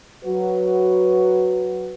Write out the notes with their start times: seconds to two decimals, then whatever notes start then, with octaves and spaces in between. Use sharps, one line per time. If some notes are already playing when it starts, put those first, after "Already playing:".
0.25 F#3 F#4 B4